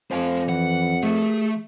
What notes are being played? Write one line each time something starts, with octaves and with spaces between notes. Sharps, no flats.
F2 F3 C5 F5 G#5
E3 F#5
A3 G#4 A4